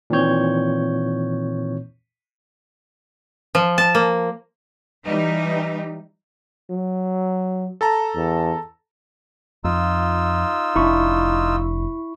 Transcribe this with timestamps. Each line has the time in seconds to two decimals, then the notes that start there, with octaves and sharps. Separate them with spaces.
0.10 A#2 D#3 E3 C4 C#5 G6
3.55 F3
3.78 A5
3.95 A#3
5.03 E3 G3 D#4
6.70 F#3
7.81 A4 A5 A#5
8.15 E2
9.64 F2 D#4 F4 E6
10.76 F1 D4 E4 B5 C#6